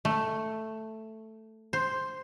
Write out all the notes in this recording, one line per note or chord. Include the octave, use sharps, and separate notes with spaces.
A3
C5